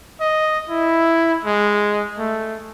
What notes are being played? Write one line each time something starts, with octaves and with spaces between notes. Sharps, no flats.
D#5
E4
G#3
A3